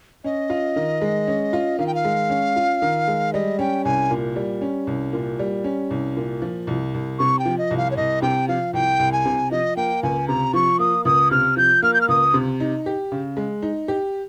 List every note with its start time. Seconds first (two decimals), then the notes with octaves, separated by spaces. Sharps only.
0.24 C#4 D#5
0.50 F4
0.76 D#3
1.02 G#3
1.27 C#4
1.53 F4
1.79 D#3 F5
1.86 G5
1.94 F5
2.05 G#3
2.30 C#4
2.56 F4
2.82 D#3
3.08 G#3
3.33 G3 D#5
3.59 C#4 G5
3.85 C2 G#5
4.11 A#2
4.36 G3
4.61 C#4
4.87 C2
5.13 A#2
5.39 G3
5.64 C#4
5.91 C2
6.17 A#2
6.42 F3
6.67 C2
6.94 C2
7.19 C3 C#6
7.39 G5
7.45 F3
7.58 D#5
7.71 C2
7.77 F5
7.91 C#5
7.96 C2 D#5
8.22 C3 G5
8.48 F3 F5
8.73 C2 G5
8.99 C2
9.12 G#5
9.25 C3
9.51 F3 D#5
9.76 A#3 G5
10.03 C#2 G#5
10.28 C3 A#5
10.53 F3 C#6
10.79 A#3 D#6
11.05 C#2 D#6
11.31 C3 F6
11.57 F3 G6
11.82 A#3 F6
11.94 G6
12.01 F6
12.08 C#2 D#6
12.34 C3
12.60 D#4
12.86 G4
13.12 C#3
13.37 G#3
13.62 D#4
13.88 G4